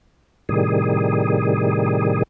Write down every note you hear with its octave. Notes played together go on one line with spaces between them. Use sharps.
A2 C3 D#3 G3 G#4